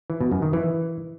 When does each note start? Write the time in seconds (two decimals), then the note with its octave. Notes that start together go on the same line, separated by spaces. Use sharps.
0.10 E3
0.21 B2
0.31 F#2
0.42 D#3
0.53 E3